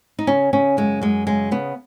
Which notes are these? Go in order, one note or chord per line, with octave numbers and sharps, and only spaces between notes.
D#4
C#3 C#4
C#3 C#4
F#2 G#3
F#2 G#3
C#3 G#3
C#3 B3